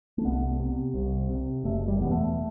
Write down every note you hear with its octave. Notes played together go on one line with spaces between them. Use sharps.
A3
C2 B3
C3
C2
C3
F#1 A3
G3
E2 B2 B3
A3